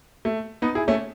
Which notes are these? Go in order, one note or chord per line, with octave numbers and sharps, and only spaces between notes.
A3
B3 D#4
E4 G#4
A3 C#4